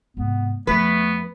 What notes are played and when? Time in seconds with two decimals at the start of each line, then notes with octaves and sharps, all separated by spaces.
0.17 G#2 C3 B3
0.67 F2 F3 A3 B3 B4